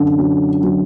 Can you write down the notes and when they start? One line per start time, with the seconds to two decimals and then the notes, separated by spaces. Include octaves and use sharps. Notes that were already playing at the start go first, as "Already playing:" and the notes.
Already playing: F#2 D3
0.18 F#3
0.63 F#3